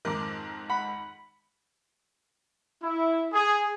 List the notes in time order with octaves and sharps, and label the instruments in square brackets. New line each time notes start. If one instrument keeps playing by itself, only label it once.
[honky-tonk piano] F2 G#2 D#3 [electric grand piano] A#4 D6
[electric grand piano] F#5 [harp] B5
[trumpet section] E4
G#4